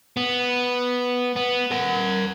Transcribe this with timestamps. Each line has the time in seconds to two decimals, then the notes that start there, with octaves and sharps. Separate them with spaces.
0.17 B3
1.36 B3
1.71 A#4 F#5